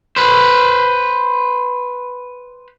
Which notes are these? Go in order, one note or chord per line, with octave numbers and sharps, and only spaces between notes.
B4 C5